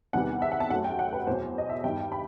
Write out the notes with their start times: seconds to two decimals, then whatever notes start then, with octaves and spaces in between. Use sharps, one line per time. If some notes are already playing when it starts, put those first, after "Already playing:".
0.13 E2 C3 D#3 G3 B3 F#5
0.42 E5
0.52 F#5
0.60 A5
0.70 F#2 F#3 A3 F#5
0.84 G5
0.99 F#5
1.13 B4
1.27 E2 B2 F#3 B3 C5
1.58 D#5
1.69 E5
1.84 G2 D#3 G3 B3 G5
2.12 B5